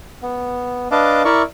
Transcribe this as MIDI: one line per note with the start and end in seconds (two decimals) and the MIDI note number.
0.22 0.88 59
0.91 1.23 62
0.91 1.23 71
0.91 1.23 75
0.91 1.23 77
0.91 1.23 81
0.91 1.23 86
1.25 1.42 64
1.25 1.42 70
1.25 1.42 74
1.25 1.42 76
1.25 1.42 85